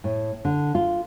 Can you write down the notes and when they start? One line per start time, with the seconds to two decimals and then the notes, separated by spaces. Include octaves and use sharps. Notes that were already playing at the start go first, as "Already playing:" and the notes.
0.04 A2
0.45 D3
0.75 F4